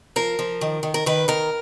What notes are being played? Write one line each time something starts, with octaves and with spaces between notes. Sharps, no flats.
F3 A#4
F3
D#3
D#3
A#4
D#3 B4
D#3 A#4